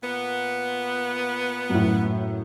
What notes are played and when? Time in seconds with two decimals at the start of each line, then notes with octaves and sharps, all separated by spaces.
0.02 A#2 B3
1.70 F#2 A2